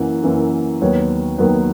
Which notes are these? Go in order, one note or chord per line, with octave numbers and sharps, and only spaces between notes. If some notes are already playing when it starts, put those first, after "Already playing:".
Already playing: F#2 E3 A#3 F#5
F#2 E3 A#3
D#2 D#3 F#3 B3 C#5
D#2 D#3 F#3 B3